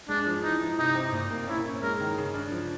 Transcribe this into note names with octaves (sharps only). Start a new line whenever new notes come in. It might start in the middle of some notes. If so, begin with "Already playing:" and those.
G#3 D4
F3
E3 D#4
E3
C3 D#4
C4
A#2
A#3
C#4 E4
C#4
G#3 A#4
D#3
C#3
D4
F3